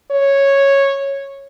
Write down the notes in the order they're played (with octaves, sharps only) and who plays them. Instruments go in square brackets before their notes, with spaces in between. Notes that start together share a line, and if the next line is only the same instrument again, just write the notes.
[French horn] C#5